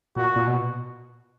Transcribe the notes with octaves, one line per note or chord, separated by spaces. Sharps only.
A#2 F#4
A#2
B2